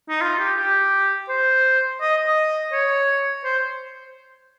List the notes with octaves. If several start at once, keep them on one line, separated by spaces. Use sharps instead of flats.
D#4
F4
G4
G4
C5
D#5
D#5
C#5
C5